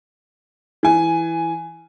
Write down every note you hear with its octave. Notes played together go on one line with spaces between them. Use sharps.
E3 G#5